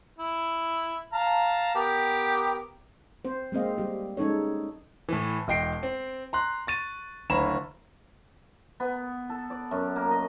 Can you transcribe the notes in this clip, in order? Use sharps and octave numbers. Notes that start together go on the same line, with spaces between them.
E4
F5 A5 A#5
B3 G4 A#4
C4 C5
G#3 A#3 C4 D#5 F5
G3 G4
G#3 C#4 D#4 A4 C#5
A2 E3
E1 D#5 G5 C7 D7
C4
A#5 C6 F#6
C#6 A6 D#7
F#1 D2 C#5 A#5 B5 E7
B3
A4
D5
F#2
A#3
D#5